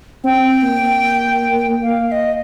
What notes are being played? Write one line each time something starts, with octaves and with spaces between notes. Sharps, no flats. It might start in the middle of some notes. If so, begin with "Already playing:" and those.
C4 G5
A#3
F5
F5
D#5